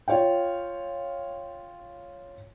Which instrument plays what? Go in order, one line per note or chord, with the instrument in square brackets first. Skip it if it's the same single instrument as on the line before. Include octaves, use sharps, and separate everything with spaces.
[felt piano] F4 C#5 F5 G5